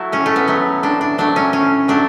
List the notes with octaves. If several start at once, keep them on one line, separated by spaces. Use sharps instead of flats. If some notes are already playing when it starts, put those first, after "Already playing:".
Already playing: F#3 A3 E4 F#4
A2 C#4
A3
B3
F#3 A3
A2 D4
D4
F#3 A3 D4
C#4
A2 C#4
F#3 A3 D4